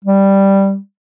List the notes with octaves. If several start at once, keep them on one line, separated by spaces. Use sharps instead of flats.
G3